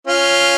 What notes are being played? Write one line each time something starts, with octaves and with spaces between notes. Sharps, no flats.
C#4 F4